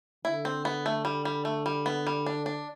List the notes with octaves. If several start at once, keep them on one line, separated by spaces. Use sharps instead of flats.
D3 E4
C4
B3
A3
G3
G3
A3
G3
B3
G3
D4
D4